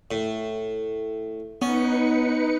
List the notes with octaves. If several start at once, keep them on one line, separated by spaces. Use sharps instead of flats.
A2
B3 C#4 D#4 B4 C#7